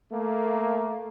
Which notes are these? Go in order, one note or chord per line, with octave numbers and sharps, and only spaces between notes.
A3 A#3